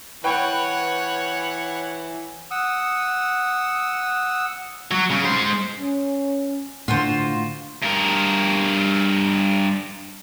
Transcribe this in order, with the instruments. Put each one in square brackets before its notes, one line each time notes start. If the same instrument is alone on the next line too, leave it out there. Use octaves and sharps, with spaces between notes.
[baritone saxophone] E3 [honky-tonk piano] B4 G5 C#6 [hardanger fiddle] C#5 F#5
[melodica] F#5 D#6 E6
[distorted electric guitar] F#3
C#3 C#4
G#3 C5
[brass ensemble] C#4
[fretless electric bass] A2 D3 [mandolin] F4 F#4 C5
[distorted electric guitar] G2 A#4